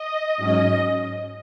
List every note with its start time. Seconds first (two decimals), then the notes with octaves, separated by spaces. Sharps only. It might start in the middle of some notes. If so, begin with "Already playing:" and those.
Already playing: D#5
0.37 G#2 F#3 C#4 D#5